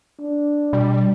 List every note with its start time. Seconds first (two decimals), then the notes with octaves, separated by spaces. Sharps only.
0.20 D4
0.73 B2 G3